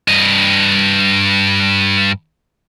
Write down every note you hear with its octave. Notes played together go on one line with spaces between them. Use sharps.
G2 D#5